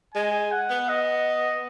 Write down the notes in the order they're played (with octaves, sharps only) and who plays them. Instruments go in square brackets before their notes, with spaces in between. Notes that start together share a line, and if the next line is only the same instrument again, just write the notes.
[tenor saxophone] G#3 [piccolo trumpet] G#5
[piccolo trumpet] F#5
[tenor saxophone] B3
[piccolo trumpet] D#5